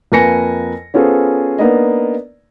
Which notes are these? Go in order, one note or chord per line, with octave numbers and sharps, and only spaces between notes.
F2 A#3 B4 G#5 A#6 C#7
B3 C#4 F4 G#4 A4 C5
A#3 B3 D4 D#4 D5 D#5